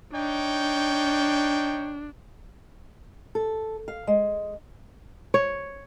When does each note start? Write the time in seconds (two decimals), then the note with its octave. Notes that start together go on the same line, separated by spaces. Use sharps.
0.13 D4 D#4 C#5 G5
3.35 A4
3.88 F5
4.07 G#3
5.34 C#5